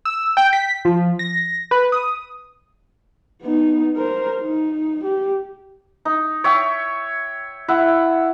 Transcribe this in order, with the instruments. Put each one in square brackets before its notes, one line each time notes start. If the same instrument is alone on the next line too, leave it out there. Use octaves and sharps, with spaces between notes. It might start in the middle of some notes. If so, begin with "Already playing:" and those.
[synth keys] E6
G5
B6
F3
A#6
B4
D#6
[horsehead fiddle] B3 D#4
A#4 C5
D#4
G4
[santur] D#4
C#5 E5 G5
E4 E5 F#5